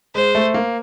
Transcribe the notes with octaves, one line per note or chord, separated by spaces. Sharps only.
G#3 C5
A3
A#3